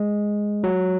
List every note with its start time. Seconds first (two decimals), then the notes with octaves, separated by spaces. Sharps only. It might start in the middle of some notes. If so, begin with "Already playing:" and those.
Already playing: G#3
0.64 F#3